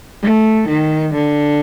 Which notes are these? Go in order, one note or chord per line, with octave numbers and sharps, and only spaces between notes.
A3
D#3
D3